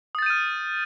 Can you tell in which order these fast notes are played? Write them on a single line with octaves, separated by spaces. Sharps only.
D#6 A6 G6 D#7 F6